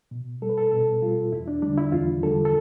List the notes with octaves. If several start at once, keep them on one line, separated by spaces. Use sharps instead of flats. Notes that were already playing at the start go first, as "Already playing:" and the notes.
B2
G3 A4
B4
A4
B2 A4
G3 F4
E2 E4
D4
D3 G3 D4
E4
E2 F4
D3 G3 A4
A4